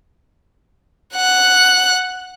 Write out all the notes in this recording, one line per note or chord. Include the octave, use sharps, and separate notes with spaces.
F#5 F#6